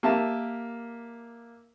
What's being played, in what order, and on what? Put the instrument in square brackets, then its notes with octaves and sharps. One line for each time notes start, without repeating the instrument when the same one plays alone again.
[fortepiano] A#3 G4 E5 A5